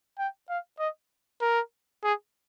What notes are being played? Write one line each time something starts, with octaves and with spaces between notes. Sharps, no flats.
G5
F5
D#5
A#4
G#4